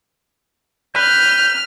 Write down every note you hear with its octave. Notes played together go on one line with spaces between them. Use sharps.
B4 F6 G6